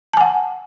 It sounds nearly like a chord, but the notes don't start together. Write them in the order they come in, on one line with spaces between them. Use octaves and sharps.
A5 G#5 F#5